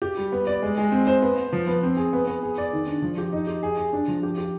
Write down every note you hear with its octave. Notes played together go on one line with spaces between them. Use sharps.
G4
G3
B3
D5
G#3
G#3
C4
C5
B3
B3
F3
B3
C4
G#4
B3
B3
G#4
D5
D#3
D4
F3
G4
D#4
G4
G#4
G#4
D4
F3
G4
G4